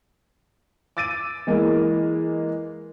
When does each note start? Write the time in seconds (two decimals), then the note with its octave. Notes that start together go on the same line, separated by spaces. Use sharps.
0.97 D6 E6 A6 D7 D#7
1.47 E3 G#3 A#3